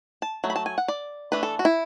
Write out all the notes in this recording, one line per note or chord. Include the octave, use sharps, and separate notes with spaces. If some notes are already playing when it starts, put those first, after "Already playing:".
A5
F#3 A3
B5
A5
G#5
F#5
D5
E3 A3 D4 B4
A4
F#4
E4